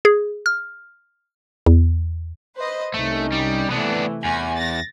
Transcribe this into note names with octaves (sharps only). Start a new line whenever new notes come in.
G#4
F6
E2
B4 C5 D#5
C2 A3 C#4 D#4
G3
C3 E3 A3 B3 D4
E2 G#5
A6 A#6